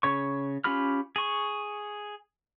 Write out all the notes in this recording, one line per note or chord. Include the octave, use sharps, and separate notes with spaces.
C#3 C#5 C#6
C#4 F4 G4 B5 F6
G#4 C#6